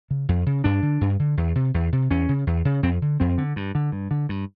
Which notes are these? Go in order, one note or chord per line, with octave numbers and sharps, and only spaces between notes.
C#3
F2
C#3
G2 D4
D3
G2
D3
E2
C3
E2
C3
E2 C#4
C#3
E2
C#3
F2 C4
D3
F2 C4
D3
G2
D3
G2
D3
G2